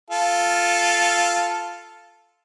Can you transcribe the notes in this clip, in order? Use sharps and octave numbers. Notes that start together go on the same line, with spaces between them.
F4 A4